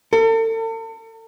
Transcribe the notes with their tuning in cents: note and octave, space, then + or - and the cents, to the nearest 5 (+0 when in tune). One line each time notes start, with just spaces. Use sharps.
A4 +40